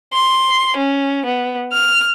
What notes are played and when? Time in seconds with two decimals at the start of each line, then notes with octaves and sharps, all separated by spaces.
0.12 C6
0.77 C#4
1.25 B3
1.72 F6